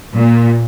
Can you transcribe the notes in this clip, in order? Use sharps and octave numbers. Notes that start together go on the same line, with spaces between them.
A#2